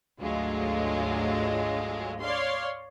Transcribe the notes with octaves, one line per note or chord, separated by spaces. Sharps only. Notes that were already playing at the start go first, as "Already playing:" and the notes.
G#1 D2 D3 F#3 G#3 F4
C#5 D5 F5 C6